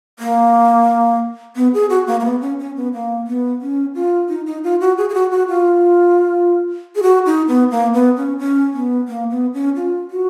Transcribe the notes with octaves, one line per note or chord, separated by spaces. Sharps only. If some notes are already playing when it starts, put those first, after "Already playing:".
A#3
B3
G#4
F#4
A#3
A#3
B3
C#4
C#4
B3
A#3
B3
C#4
F4
D#4
D#4
F4
F#4
G#4
G#4
F#4
F#4
F4
G#4
F#4
D#4
B3
A#3
B3
C#4
C#4
B3
A#3
B3
C#4
F4
F#4